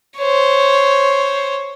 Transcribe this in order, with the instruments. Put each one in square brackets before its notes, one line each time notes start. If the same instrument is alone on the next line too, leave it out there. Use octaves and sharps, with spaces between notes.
[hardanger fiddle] C5 C#5